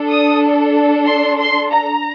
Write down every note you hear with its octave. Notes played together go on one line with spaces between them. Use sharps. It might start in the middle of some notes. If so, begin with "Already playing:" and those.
Already playing: D4 A4
D#6
C6
C6
A#5